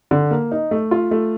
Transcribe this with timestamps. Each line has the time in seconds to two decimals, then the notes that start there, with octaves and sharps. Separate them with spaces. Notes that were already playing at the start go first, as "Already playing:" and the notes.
0.11 D3
0.31 A#3
0.52 D#4
0.71 A3
0.91 F4
1.11 A3